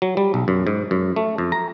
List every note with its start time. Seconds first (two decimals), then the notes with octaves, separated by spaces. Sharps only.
0.02 F#3
0.17 G3
0.34 B1
0.48 F#2
0.67 G#2
0.91 F#2
1.16 A3
1.38 F2
1.52 A#5